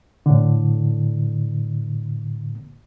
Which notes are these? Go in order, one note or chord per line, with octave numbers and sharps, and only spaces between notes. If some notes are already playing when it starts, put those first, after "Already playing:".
A2 D3